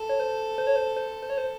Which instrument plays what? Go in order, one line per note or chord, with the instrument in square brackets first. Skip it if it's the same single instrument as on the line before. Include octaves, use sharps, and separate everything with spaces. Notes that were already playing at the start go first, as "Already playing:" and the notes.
Already playing: [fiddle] A4
[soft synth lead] C#5
C5
C5
C#5
C5
C5
C5
C#5
C5